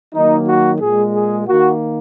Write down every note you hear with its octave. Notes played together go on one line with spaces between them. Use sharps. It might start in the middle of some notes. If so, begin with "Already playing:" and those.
D#3 F#3 A#3 D#4
F#4
A#2 G#3 G#4
G#4
D#3 A#3 F#4